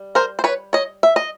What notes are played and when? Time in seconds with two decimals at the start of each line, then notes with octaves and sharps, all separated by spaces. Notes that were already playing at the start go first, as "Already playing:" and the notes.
Already playing: G3
0.15 A#4 C5
0.39 C5
0.44 B4 C#5
0.73 C#5 D#5
1.03 E5
1.16 D#5